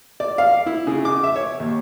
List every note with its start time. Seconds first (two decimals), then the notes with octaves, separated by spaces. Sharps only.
0.20 D5
0.38 F5
0.66 E4
0.87 C#3
1.05 D6
1.24 E5
1.36 C#5
1.60 D#2